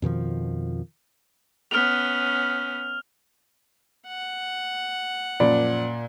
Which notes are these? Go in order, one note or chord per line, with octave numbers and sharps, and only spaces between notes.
F2 B2 D#3 F3
B3 C#4 F6 F7
F#5
F#2 A#2 F3 D5 B5